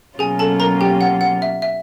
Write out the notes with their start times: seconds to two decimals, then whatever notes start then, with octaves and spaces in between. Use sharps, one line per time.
0.19 B2 F#3 A#3 C#4 F4 G#4 G#5
0.39 A4 A5
0.60 A#4 A#5
0.81 G4 G5
1.01 F#5
1.21 F#5
1.42 E5
1.62 E5